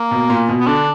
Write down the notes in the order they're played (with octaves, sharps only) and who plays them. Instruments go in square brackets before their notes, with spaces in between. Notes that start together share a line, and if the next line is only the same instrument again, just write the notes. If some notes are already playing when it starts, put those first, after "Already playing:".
Already playing: [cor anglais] A#3
[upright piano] B2
A#2
B2
[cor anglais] B3
[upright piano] D3 [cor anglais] D4